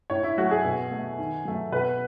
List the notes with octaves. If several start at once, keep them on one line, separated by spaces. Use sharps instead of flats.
A2 C#5
E4
F#3 A3 F#4
G#4
B2
A3
D#3
F#3 A3
B2 B4